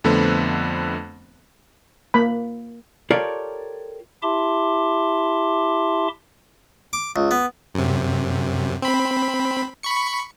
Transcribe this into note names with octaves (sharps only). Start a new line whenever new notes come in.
F2 D3 A3 B3 C4
A#3 B5
F4 G4 A4 A#4 C#5 D5
E4 G4 E5 A5 C6 D6
D6
C#2
B3
F#2 C3
C4 B5
B5 C#6 C#7